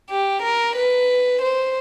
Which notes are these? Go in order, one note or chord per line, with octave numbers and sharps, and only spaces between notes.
G4
A#4
B4
C5